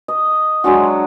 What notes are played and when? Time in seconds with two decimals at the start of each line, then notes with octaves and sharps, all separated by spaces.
0.08 D#5
0.64 F#3 G#3 D4 F#4